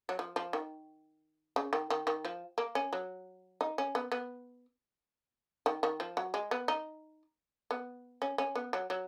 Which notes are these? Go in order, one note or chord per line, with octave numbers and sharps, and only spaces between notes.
F#3
F3
F3
D#3
C#3
D#3
D#3
D#3
F3
A#3
C#4
F#3
D#4
C#4
B3
B3
D#3
D#3
F3
F#3
G#3
B3
D#4
B3
C#4
C#4
B3
F#3
F#3